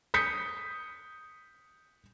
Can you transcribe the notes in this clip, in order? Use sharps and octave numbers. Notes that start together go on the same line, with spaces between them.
D#6 G6 B6 C#7